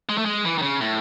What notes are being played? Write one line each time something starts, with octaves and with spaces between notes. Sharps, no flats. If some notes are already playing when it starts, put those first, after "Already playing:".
G#3
A3
G#3
E3
D#3
C#3
A2